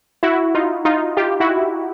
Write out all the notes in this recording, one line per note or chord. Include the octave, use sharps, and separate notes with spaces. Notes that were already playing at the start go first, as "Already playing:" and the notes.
E4 F#4
D#4 F4
D#4 F4
F4 G4
E4 F#4